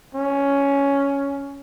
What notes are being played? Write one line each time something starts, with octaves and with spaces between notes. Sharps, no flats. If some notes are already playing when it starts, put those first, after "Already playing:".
C#4